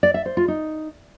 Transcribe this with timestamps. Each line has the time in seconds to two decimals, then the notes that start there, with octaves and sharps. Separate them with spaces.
0.03 D5
0.14 E5
0.26 C5
0.37 F4
0.48 D#4